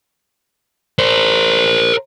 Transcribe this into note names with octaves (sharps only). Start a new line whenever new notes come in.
A#4 C5